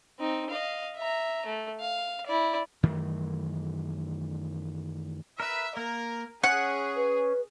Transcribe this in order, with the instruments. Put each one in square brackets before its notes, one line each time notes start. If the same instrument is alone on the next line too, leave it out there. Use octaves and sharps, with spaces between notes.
[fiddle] C4 D#4
D#5 F5
E5 A#5
A3
F5
E4 D5
[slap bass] F#2 D#3 E3 A3
[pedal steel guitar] A#4 B4 [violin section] E5
[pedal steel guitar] A#3 [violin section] A#4
[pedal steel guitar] C#4 C#5 F#6 [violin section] G#4 [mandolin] F#5
[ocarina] B4